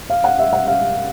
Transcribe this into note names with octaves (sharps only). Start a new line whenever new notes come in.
F5
F#5
E5
F#5
F5